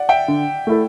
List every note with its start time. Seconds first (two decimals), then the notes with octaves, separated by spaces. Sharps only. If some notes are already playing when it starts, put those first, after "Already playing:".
Already playing: D5 F#5
0.09 E5 G5
0.28 D3
0.67 A3 E4 A4